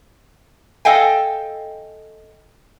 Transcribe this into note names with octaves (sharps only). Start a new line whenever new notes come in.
A4 D#5 F5 G5 G#5